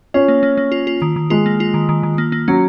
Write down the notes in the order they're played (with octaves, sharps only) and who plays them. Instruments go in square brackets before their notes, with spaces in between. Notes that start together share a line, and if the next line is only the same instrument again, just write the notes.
[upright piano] C#4 [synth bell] F4
[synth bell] A#3
A#3
A#3
F4
F4
D#3
D#3
[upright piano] G#3 [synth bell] F4
[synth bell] A#3
F4
D#3
D#3
D#3
A#3
A#3
[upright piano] F#3 [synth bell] C#4